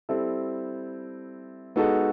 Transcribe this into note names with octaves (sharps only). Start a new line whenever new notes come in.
G3 C4 E4 A4
G#3 B3 D#4 F#4 A4